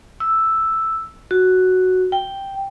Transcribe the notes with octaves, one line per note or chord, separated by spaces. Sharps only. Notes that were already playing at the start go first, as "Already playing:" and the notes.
E6
F#4
G5